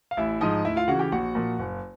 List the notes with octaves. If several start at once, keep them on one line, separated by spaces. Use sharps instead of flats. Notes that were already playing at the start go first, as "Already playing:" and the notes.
F5
A1 E4 E5
G#2 F3 D#4 D#5
D2 E4 E5
F4 F5
C#3 E3 F#4 F#5
G4 G5
A#1 F#4 F#5
A#2 F3
F#1